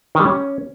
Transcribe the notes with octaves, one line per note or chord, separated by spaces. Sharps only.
D#3
G3
C#4